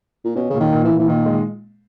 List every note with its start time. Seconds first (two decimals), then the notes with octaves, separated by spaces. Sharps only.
0.24 A#2
0.36 B2 C#4
0.50 A#2 C#3
0.60 D#3
0.73 A#2
0.84 E3
0.91 A#2
0.99 E3
1.08 A#2 D#3
1.26 G#3